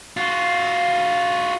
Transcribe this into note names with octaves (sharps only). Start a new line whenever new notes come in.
F4 F#4